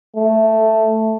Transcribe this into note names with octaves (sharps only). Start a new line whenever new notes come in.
A3